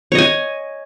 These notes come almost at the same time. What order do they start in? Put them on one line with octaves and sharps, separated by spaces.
C#5 D#5 G#5